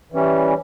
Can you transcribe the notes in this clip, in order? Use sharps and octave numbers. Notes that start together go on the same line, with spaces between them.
E3 G3 C#4